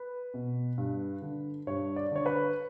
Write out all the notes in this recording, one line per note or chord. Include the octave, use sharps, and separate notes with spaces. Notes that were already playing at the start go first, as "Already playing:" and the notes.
Already playing: B4
B2
G2
D3
G2 C#5
D5
D3 C#5
B4